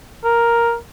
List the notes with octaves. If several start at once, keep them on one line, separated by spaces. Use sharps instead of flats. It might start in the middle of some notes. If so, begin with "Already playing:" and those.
A#4